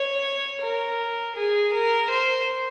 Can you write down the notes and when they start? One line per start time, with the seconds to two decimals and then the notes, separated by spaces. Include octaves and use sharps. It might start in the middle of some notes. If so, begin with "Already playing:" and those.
Already playing: C#5
0.61 A#4
1.36 G#4
1.73 A#4
2.11 C5